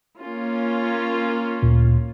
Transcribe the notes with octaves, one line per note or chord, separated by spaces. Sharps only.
A#3 C#4 F4
D2 A#2